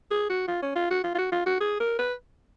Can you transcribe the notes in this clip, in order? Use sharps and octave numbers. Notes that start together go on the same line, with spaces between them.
G#4
F#4
F4
C#4
F4
F#4
F4
F4
F#4
F4
F#4
G#4
A#4
B4